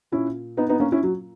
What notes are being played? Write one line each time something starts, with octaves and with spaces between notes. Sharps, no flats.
A#2 C#4 E4
B3 D#4
B3 D#4
A#3 C#4
C#4 E4
F#3